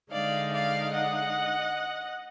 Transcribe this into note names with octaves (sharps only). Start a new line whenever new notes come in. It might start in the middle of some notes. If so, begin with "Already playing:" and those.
D3 G#3 D#4 D5 F5
D5 F5
D#5 F#5